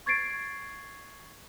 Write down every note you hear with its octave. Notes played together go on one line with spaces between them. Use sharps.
C#6 G#6 A6 C7 D7